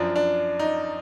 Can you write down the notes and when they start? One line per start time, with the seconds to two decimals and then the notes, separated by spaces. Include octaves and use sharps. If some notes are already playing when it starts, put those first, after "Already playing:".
Already playing: F#2 F3 D4
0.16 D4
0.60 D#4